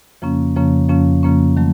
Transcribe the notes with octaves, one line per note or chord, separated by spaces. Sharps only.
F2 C#3 F3 A#3 C#4
F2 C#3 F3 A#3 C#4
F2 C#3 F3 A#3 C#4
F2 C#3 F3 A#3 C#4
D#3 F#3 A3